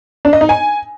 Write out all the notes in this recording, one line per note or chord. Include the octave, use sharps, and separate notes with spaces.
D4
D#5
D#4
G#5